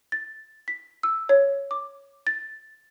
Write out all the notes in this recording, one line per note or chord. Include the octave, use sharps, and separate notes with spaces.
A6
B6
E6
C#5
D6
A6